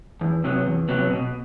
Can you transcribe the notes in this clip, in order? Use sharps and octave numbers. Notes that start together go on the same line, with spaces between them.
E2
C3 F#3 B3
E2
C3 F#3 B3
B2